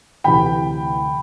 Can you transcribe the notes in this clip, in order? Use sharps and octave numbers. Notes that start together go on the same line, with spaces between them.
D2 C3 E3 G5 B5